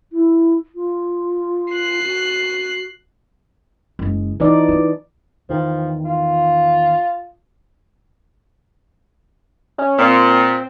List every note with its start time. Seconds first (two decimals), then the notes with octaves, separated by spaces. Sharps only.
0.12 E4
0.75 F4
1.73 F#6 C7
2.03 F#4
3.99 F#1 G#3
4.40 E3 D#4 F4 D5
4.69 F4
5.49 E2 D#3 F3
6.05 F4
9.78 C#4
9.99 A#2 C4